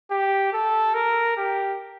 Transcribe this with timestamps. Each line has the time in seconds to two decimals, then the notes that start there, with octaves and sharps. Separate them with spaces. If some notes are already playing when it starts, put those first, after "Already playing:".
0.11 G4
0.53 A4
0.94 A#4
1.37 G4